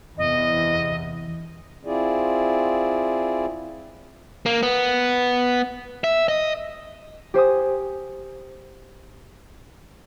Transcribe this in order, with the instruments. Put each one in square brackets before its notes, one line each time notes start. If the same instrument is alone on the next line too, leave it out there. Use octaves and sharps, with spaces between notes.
[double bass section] E2 C3 [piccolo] D#5
[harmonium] C4 E4 F4 G#4 D5
[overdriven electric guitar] A#3
B3
E5
D#5
[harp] G4 C5 G#5 D#6